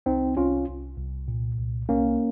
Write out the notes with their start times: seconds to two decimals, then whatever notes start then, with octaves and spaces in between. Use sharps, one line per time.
0.06 C2 C4 D#4
0.37 C2 C#4 F4
0.67 C2
0.98 C2
1.28 A#2
1.58 C2
1.89 C2 A#3 C#4